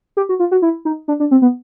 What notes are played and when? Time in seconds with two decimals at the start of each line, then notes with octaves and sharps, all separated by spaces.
0.17 G4
0.29 F#4
0.39 F4
0.51 F#4
0.62 E4
0.85 D#4
1.08 D4
1.20 D4
1.31 C4
1.42 B3